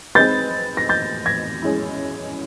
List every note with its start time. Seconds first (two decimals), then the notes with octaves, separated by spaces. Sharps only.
0.15 G#3 C4 D#4 G#4 B4 G6 A6
0.77 A#6
0.89 G6 A6
1.26 G#6 A#6
1.62 G#3 C#4 E4